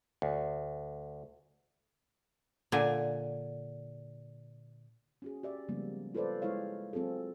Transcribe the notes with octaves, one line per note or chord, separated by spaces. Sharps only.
D2
A#2 D3 G#5
C#4 F#4 G#4
G4 D5 E5
C#3 F3 G3 G#3 A#3 B3
F4 A4 B4 C5 D5
G#3 E4 C5 C#5 F5
F#3 C4 F4 G#4 A4